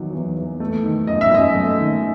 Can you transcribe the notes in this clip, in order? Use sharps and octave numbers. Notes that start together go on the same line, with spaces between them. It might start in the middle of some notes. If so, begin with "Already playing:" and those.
Already playing: E2 D#3 F#3
E2
E2
A3
D#3
F#2 D#5
E5
F#2 D#5
A3
D#3